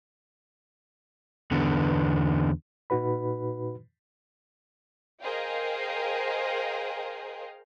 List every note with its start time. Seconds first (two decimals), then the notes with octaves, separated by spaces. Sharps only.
1.51 E2 D3 B3
2.90 A#2 D#4 F#4 B4 B5
5.22 G#4 A#4 C5 D#5 F5 G5